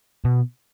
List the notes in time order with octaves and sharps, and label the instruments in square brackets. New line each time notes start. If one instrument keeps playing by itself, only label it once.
[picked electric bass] B2